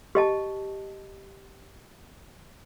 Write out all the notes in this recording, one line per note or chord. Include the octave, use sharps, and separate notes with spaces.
G4 D#5 A5